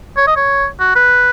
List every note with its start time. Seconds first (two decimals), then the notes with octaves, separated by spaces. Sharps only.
0.17 C#5
0.27 D#5
0.36 C#5
0.80 F#4
0.95 B4